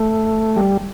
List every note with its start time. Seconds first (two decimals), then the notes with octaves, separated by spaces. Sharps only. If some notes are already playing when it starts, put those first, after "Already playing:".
Already playing: A3
0.56 G3